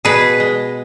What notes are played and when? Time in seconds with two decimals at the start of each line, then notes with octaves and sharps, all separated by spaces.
0.05 B2 G#4 B4
0.40 G#3